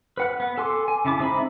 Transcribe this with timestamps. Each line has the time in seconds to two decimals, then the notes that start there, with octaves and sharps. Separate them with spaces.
0.17 B4 F#5 F#6
0.40 B3
0.58 A4 G#5 C6 D6
0.88 G#5
1.05 C#3 E4 A5 D6
1.19 G#3 C4 D#4 E5 B5